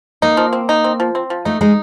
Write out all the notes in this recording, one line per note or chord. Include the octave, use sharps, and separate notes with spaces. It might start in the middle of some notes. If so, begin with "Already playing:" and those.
A#3 D#4
F3
C4
D#4
C4
F3
C4
F3
A3 D#4
G#3 D#4